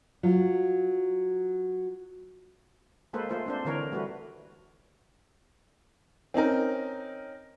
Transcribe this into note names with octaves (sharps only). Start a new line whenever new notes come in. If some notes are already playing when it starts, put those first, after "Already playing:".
F#3 F4
G#3 A#3 A4 B4 C5
A3 F4 C5
C4 D4 C5
D3 E3 A#4 C#5
G3 A3 F#4 B4
C4 C#4 D#4 A#4